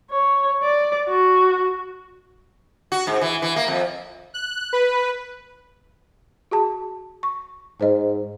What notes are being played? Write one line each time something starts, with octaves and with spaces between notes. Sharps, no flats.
C#5
D5
F#4
F#4
G#2
E3
E3
A#3
F2
F#6
B4
F#4 G#4 A5
C#6
G#2 C5 D#5